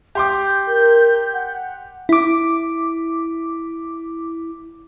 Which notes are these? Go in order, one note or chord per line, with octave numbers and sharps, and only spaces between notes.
G4 C6 D6 G6
A#4
F#5
E4 D6